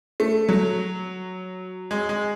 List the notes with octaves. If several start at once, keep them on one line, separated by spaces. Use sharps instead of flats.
A3
F#3
G#3
G#3